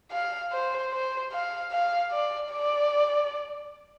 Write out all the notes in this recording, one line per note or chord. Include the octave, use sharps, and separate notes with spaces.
F5
C5
C5
F5
F5
D5
D5